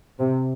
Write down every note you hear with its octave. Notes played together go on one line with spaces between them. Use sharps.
C3